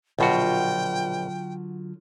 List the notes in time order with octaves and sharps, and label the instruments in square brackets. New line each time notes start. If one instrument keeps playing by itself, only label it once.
[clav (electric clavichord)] A#1 B2 F#4 [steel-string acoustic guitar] D3 F#3 F4 [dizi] G5